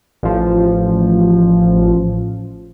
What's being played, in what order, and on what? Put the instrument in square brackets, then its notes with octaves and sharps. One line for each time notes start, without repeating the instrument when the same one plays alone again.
[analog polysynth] A1 F3